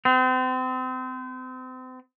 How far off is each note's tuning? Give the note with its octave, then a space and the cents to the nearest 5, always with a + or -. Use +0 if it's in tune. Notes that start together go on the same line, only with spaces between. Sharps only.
C4 -35